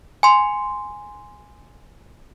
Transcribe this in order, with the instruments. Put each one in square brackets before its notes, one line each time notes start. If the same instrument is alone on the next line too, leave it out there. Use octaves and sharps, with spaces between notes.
[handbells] G#5 C6